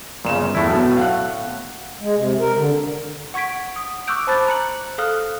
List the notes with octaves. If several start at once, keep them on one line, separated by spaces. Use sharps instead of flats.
G1 A#2 C#3 E7
E2 A2 A3 E4
B1 B2
F5 F#5 F#6
G#3
C3
A#4
D3
F#5 C#6 G#6 B6 D7
D#6
C#6 D6 E6 F#6 G6 D7
C5 A5 B5 D6 F#6 A6
A#5 F#6 C#7 F#7
A4 F5 D#6 F6 F#6